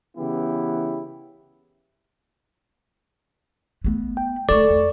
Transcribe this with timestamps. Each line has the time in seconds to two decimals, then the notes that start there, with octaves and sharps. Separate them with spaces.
0.17 C#3 E3 B3 E4 G4
3.84 A3 B3
4.17 G5
4.49 D3 A3 A4 D5 C#6
4.70 F2